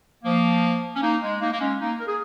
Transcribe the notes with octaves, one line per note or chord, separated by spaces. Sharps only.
F3 A#3
C#4
A#3 D#4
G#3
A#3 D#4
A#3
G#3 C#4
A#3 D#4
A#4
G#4